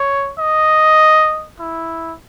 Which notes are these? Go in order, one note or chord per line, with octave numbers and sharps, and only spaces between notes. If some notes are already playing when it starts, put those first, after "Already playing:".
Already playing: C#5
D#5
E4